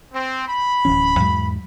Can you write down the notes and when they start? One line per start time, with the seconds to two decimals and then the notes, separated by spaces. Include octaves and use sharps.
0.14 C4
0.47 B5
0.85 D1 E3 C#4
1.20 E2 G#2 F#3